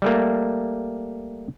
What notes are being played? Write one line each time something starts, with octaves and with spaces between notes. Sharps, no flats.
G3 A3 A#3